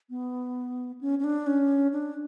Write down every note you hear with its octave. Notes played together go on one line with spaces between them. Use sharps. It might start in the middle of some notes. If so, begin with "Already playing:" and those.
B3
C#4
C#4
D4
C#4
D4